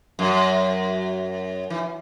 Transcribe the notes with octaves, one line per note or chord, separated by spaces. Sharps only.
F#2
E3